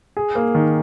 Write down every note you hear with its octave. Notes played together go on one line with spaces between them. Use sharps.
G#4
A#3
D#3